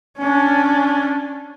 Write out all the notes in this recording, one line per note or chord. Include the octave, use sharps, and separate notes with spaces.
C#4 D4